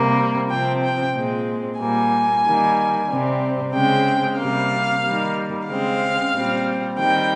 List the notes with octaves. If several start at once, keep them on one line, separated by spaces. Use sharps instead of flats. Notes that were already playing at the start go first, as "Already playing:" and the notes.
Already playing: C3 G3 A#3
C3 F3 C4 G5
G5
A#2 G#3 C4
A#2 G3 A#3 G#5
D#3 G3 A#3
C3 G3 C4
C#3 G#3 C4 G5
C3 G3 A#3 F5
D#3 G3 A#3
C#3 G#3 C4 F5
A#2 G3 C4
D#3 G3 C4 G5